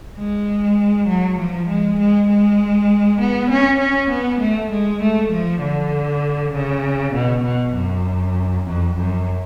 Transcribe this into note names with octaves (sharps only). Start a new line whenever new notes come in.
G#3
F#3
F3
G#3
G#3
G#3
B3
C#4
C#4
B3
A3
G#3
A3
F3
D3
C#3
B2
B2
F#2
F2
F#2